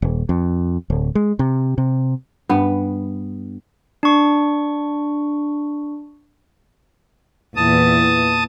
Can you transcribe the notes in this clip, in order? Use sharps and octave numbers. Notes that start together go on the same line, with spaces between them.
D#1
F2
D1
G#3
C3
C3
G2 B3
D4 C#6
E2 A#2 E3 A5 D#6